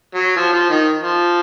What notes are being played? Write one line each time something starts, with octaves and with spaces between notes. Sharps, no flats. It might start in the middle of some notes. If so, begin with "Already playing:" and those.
F#3
F3
F3
D#3
F3